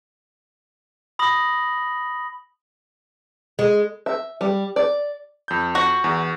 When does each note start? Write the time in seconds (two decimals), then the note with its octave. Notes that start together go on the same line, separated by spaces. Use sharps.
1.19 B5 D#6 A#6 F#7
3.59 G#3
4.06 E5
4.41 G3
4.76 D5
5.48 F2 G6
5.75 F#4
6.04 E2